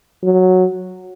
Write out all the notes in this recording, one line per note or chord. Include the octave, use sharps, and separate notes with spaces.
F#3